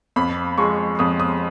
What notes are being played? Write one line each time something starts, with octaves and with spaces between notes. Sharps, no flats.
F2 B5
F3 G#3 C#6
F2 D#6
D#6